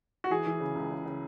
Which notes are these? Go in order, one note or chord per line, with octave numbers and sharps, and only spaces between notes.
F#4
E3 G#4
E3
C#3
C#2
C#3
C#3